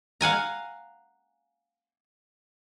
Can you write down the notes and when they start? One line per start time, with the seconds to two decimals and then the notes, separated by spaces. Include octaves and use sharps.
0.21 F5 F#5 G#5 A#5